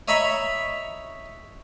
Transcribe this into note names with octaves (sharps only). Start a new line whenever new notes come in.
C#5 D#5 E5 A#5 B5 C#6